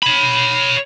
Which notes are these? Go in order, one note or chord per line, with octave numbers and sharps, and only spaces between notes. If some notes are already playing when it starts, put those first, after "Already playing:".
C#5 B5